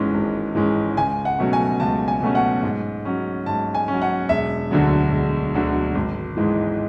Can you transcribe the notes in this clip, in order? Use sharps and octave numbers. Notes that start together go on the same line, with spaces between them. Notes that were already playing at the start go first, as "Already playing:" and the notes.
Already playing: G#1 G#2 E3 G#3 C#4
G#1
G#2 E3 G#3 C#4
C#2 G#5
F#5
B2 F#3 A3 C#4
G#5
C#2 A5
G#5
B2 F#3 A3 C#4
F#5
G#2
F#3 C#4
G#2 A5
G#5
F#3 C#4
F#5
E1 E5
D2 D3 F#3
E1
D2 D3 F#3
G#1
G#2 E3 G#3